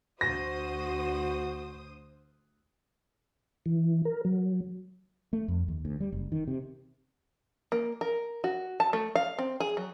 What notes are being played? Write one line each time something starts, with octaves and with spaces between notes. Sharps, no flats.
D2 F#4 C5 D#6 A#6
E3
A#4
F#3
A3
F2
D#2
D2
G3
F#1
D#3
C3
A#3
A#4
F#4
A5
A3
F5
C4
G#4
F#3